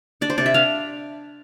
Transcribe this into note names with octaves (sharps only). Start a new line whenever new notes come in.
D4 D5
C5
C3 D5
E5
D4 F5